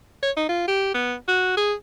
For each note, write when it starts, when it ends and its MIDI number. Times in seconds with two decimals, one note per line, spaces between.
0.23 0.31 73
0.37 0.45 63
0.49 0.63 65
0.68 0.90 67
0.94 1.15 59
1.28 1.56 66
1.57 1.74 68